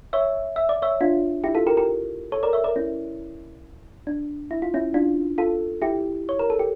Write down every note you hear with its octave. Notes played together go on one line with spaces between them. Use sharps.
C#5 E5
E5
D5
C#5 E5
D4 F4
E4 G4
F4 A4
G4 A#4
G4 A#4
A4 C#5
A#4 D5
C#5 E5
A#4 D5
C#4 E4
D4
E4
F4
C#4 E4
D4 F4
F4 A4
E4 G4
C#5
A#4
A4
G4